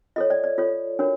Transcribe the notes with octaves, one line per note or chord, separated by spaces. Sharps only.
F4 A4 C#5 D#5
D5
D5
F4 A4 C#5
D4 F#4 A#4 C#5